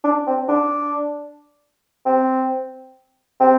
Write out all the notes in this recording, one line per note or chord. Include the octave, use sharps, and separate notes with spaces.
D4
C4
D4
C4
C4